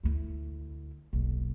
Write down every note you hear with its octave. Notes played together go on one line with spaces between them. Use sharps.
D2 E4
D#1 B1